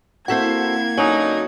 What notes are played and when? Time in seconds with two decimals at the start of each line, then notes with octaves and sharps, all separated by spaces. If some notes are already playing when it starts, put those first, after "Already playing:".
0.28 A#3 C4 E4 F#4 A4 C5 F#5 G#6
0.97 D3 F#3 C#4 D#4 F#4